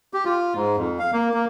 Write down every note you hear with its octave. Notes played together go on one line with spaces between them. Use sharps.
G4
F4
G#2
F2
F5
A#3
A#3